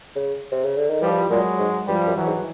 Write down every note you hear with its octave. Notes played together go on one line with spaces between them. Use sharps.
C#3
C3
C#3
D3
D#3
E3 F3 G3
A#2 F#3 G#3
G#2
G2 F3 G3
F#2
E3 F#3
G#2